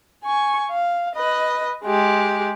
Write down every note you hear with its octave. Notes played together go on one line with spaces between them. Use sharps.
G#5 C#6
F5
B4 D#5
G#3 G4